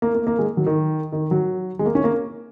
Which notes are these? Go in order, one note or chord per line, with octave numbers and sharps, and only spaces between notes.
A#3
A#3
A#3
G#3
F#3
D#3
D#3
F#3
G#3
A#3
C#4
A#3